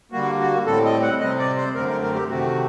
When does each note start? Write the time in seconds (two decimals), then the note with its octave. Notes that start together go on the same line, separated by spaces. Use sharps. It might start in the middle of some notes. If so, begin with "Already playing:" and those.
0.12 D3 G3 A#3 F#4
0.40 F#4
0.66 A2 G3 C4 A4
0.85 D#5
1.02 F#5
1.20 C3 G3 C4 D#5
1.39 D5
1.57 C5
1.75 F#2 D3 A3 C4 A#4
1.89 A#4
2.02 A#4
2.15 G4
2.28 C3 D#3 A3 C4 F#4